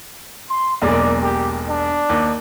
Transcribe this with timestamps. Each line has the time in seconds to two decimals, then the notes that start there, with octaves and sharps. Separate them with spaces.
0.49 C6
0.82 E1 B1 A#3 D5
1.21 G4
1.68 D4
2.09 D#2